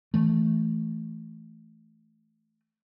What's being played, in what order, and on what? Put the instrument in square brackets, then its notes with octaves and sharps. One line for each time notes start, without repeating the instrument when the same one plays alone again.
[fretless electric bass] E3 A3